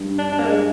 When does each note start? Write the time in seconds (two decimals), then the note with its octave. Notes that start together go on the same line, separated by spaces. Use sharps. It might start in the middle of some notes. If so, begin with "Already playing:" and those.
Already playing: G2
0.18 D4
0.32 G2 D4
0.39 A#3
0.46 G#3